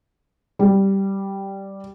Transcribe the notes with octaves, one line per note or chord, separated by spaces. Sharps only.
G3